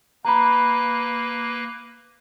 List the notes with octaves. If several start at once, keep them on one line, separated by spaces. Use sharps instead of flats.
A#3 B4 A#5 B5 F#6